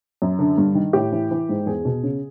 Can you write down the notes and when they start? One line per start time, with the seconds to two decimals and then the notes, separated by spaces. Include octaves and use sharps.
0.22 F#2
0.39 D3
0.58 G2
0.75 D#3
0.93 A2 G4
1.12 E3
1.31 E3
1.49 G#2
1.66 E2 G#4
1.85 B2
2.03 C#3